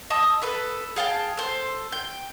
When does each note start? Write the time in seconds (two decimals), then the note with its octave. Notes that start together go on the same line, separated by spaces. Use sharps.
0.10 D#5 A5 D#6 E6
0.42 A4 B4 B5
0.96 G#4 F5 G5 A5
1.37 A4 C5
1.92 G5